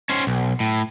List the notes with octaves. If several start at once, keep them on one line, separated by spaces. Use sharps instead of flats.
C#4 C5
B1
A2